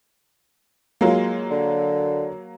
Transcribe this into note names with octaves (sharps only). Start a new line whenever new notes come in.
F#3 G#3 A#3 F4 G#4
D3